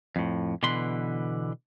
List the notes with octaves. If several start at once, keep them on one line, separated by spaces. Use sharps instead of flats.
F2 A2
B2 D3 E3 B4 C6